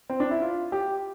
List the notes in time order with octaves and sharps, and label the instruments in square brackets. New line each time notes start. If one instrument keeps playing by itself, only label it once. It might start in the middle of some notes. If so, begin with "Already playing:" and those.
[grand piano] C4
D4
E4
F4
G4